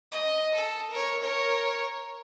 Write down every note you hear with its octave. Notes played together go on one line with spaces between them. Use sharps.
D#5
A4
A#4 C#5
A#4 C#5